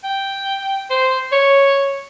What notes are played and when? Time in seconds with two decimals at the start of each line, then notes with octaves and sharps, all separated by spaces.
0.04 G5
0.90 C5
1.32 C#5